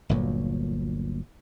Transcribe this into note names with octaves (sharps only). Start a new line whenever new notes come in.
G1 D2 A#2 F#3